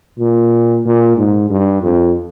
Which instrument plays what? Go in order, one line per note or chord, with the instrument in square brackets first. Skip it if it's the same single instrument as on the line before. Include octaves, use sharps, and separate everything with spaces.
[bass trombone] A#2
A#2
G#2
G2
F2